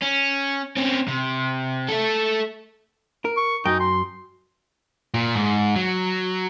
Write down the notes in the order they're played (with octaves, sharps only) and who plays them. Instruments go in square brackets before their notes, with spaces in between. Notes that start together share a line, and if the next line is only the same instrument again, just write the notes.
[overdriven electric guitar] C#4
C4 C#4
C3
A3 A4
[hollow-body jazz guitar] A#4
[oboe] C#6
[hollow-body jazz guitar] F#2 G5 [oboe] D#4
[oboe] C6
[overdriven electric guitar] A#2
G#2
F#3